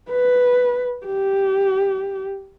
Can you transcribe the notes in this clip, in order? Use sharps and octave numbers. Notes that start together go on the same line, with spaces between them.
B4
G4